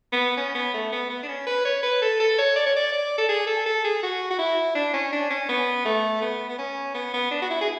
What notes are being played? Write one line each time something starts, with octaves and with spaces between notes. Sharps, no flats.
B3
C#4
B3
A3
B3
B3
D4
C#4
B4
C#5
B4
A4
A4
C#5
D5
C#5
D5
D5
A4
G#4
A4
A4
G#4
F#4
F#4
E4
D4
C#4
D4
C#4
B3
A3
B3
B3
C#4
B3
B3
D4
F#4
E4
G#4